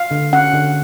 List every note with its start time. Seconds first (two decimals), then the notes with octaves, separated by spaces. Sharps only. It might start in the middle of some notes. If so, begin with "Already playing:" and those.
Already playing: F5
0.11 D3
0.33 C#4 F#5
0.53 D3